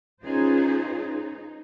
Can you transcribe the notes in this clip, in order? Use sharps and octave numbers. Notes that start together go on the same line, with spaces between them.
C#4 D#4 F4 G#4 B4 C5
D#4